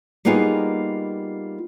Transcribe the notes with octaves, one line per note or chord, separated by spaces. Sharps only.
G3 A#3 B3 D#4 F4 G#4